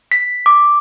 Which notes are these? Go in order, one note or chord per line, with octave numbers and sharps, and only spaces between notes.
B6
D6